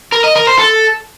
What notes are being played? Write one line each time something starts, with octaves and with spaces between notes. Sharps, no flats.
A#4
D#5
A#4
C5
A4